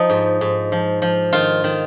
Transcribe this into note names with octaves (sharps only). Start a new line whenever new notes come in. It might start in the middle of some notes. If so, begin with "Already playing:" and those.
Already playing: F3 D#4
G#2
G#2
F3
F3
D#3 F4
D#3